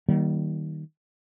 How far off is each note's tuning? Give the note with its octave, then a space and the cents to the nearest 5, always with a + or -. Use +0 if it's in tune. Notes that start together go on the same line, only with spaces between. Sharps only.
D#3 +0 G3 -40 A#3 +0